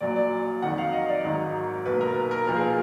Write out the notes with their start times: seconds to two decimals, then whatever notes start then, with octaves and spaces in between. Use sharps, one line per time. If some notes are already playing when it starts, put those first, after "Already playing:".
0.01 A#1 A#2 F#3 D5
0.16 D5
0.62 F2 D#3 F#3 F#5
0.78 F5
0.93 D#5
1.08 D5
1.24 G#1 G#2 D#3 F#3
1.85 B1 A#2 F#3 B4
2.01 A#4
2.16 B4
2.31 A#4
2.47 B1 A#2 F3 A#4
2.56 G#4